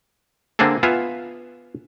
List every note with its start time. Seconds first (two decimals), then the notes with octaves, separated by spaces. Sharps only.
0.59 D3 A#3 C4 D4 G#4 A4
0.83 B3 F4 E5 F5 G#5